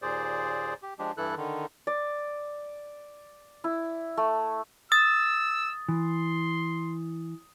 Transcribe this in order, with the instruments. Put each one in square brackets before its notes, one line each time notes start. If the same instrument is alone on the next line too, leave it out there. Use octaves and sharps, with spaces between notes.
[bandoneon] D#2 A#2 G#4 C5 D5
G4
F3 G#3 D4 G4
G2 E3 E4 A4 F#6
D3 D#3
[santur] D5
E4
A3
[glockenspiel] D#6 [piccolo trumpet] E6 [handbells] A6
[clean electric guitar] E3 [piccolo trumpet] C6